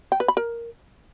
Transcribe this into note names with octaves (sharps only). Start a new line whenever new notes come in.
G5
B4
B5
A#4